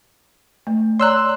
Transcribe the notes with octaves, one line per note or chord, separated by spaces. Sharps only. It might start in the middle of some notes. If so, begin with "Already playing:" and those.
A3
C#5 D5 A#5 C6 E6 F#6